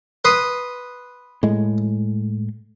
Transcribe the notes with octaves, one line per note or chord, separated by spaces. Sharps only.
B4 C6 D#6
A2 G#3